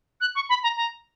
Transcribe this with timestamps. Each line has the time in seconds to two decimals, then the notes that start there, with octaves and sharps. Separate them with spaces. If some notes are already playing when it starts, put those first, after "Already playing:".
0.21 F#6
0.35 C#6
0.49 B5
0.63 A#5
0.77 A#5